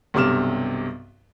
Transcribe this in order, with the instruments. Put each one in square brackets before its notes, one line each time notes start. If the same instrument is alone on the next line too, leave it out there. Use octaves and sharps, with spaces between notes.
[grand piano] B1 G2 C3 D6 F6 E7